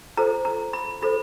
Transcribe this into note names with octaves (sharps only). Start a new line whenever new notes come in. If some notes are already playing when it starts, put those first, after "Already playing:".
F4 A4 C5 A#5
A#5
B5
F4 A4 C5 B5